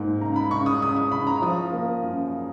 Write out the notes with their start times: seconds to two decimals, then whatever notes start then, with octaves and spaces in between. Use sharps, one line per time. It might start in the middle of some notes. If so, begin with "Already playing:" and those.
Already playing: G#2 A#3
0.21 C#3 A#5
0.36 B5
0.51 C#3 C#6
0.66 D#6
0.82 C#3 D#6
0.97 D#6
1.11 C#3 B5
1.27 A#5
1.42 F3 D#6
1.72 A#3
2.03 F#2